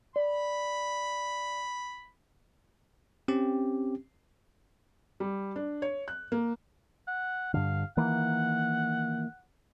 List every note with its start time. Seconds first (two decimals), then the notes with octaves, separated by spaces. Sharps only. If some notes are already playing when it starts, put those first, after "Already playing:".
0.16 D5 B5
3.28 C4 C#4 G4
5.20 G3
5.56 D4
5.82 C#5
6.08 F#6
6.32 A#3
7.07 F#5
7.54 G2 D3 F5
7.97 D#3 E3 A#3 F#5